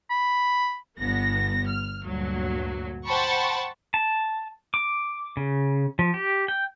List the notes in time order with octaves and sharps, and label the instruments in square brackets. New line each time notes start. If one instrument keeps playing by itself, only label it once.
[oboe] B5
[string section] G1 G2 B3 A#6
F6
D2 G2 A#2 F#3
C5 F#5 G5 A5 B5 C#6
[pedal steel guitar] A5
D6
C#3
F3
G4
G5